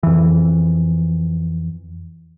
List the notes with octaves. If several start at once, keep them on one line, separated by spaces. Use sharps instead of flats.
F2 E3